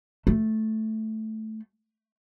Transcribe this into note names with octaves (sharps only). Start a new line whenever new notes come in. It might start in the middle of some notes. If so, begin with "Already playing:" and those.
A3